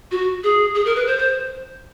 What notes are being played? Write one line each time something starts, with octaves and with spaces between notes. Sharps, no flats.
F#4
G#4
G#4
A#4
B4
C5
C5